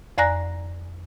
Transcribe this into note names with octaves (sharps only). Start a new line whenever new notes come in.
F2 D5 G#5 A#5 F#6 A#6